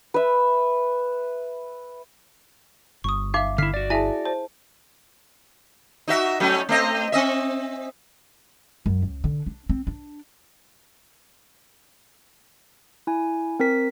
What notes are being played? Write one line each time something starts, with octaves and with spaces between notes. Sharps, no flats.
B4 E5
G1 C#6 D#6
D#4 E5 F5 D6
D3 E4 F6 B6 C7
F#4 D5
E4 G#4 E5 G#5 A5
C5 A5
D#4 F#4 E5
F#3 A3 C#4
A3 C4 D#5
C4 D#5 E5
F#2
C#2
D3
D4
C4
D4
E4 G#5
C4 A#4 B6